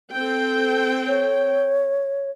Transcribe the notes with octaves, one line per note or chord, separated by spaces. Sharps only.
C4 A4 G5
C#5